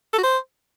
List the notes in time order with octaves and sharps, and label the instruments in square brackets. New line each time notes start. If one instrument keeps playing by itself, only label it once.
[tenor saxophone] A4
F#4
C5